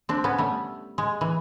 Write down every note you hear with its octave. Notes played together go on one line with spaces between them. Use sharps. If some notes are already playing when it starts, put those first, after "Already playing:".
C4 D4
B3 C#4
G3 A3
G#3
E3